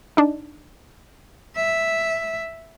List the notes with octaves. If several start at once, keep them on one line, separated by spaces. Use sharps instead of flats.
D4 D#4
E5